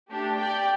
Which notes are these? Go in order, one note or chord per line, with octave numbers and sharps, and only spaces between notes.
A3 D4 G4
G4 D5 G5